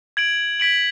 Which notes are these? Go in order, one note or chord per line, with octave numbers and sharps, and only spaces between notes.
G#6 D7 F#7
G#6 B6 D7 F#7